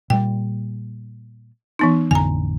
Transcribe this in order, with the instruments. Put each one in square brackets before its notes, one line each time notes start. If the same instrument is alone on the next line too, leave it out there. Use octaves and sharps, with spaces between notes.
[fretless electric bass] A#2 G3 [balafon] G5
[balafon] E3 B3 D#4
[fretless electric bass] A1 F2 D3 [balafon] G#5 A#5